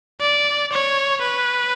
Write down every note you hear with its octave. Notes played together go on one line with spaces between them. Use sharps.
D5
C#5
B4